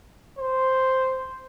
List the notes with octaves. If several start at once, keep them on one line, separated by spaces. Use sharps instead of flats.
C5